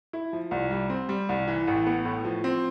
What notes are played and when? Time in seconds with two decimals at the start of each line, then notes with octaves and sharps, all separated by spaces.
0.13 E4
0.33 F3
0.51 C2
0.71 G3
0.90 C4
1.09 G3
1.29 C2
1.48 E3
1.68 A1
1.86 B3
2.05 A2
2.25 F3
2.44 C4